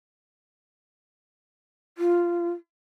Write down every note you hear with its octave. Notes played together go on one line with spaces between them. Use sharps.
F4